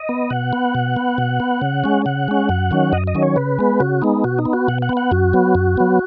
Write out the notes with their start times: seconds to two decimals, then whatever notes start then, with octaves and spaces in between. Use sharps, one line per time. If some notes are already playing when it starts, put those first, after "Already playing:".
Already playing: D#5
0.09 B3
0.30 B2 F#5
0.53 B3
0.75 B2
0.96 B3
1.18 B2
1.40 B3
1.62 C#3
1.84 G#3 C#4
2.06 C#3 F#5
2.28 G#3 C#4
2.49 F#2
2.71 D#3 F#3 C#4
2.93 F#2 D#5
3.07 D#5
3.15 D#3 F#3 C#4
3.22 C#5
3.36 C#3 B4
3.59 G#3 B3
3.80 C#3 F#4
4.02 G#3 B3 D#4
4.24 B2 F#4
4.39 D#4
4.45 B3
4.53 F#4
4.68 B2 F#5
4.82 F#5
4.89 B3
4.97 F#5
5.11 F#2 F#4
5.33 F#3 B3
5.55 F#2
5.77 F#3 B3